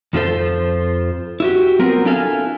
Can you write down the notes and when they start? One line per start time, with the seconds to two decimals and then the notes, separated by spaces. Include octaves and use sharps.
0.13 F2 F3 C#4 F4 A4 C5
1.40 E4 F#4 G4
1.79 F#3 B3 C4 F4 A#4
2.05 D4 E4 A4 F5 F#5 G#5